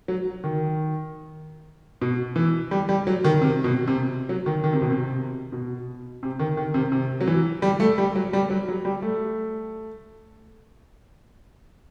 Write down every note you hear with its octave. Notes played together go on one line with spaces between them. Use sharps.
F#3
D#3
B2
E3
G3
G3
F#3
D#3
C3
B2
C3
F#3
D#3
D#3
C3
B2
C3
B2
C3
D#3
D#3
C3
C3
F#3
E3
G3
A3
G3
F#3
G3
F#3
F#3
G3
A3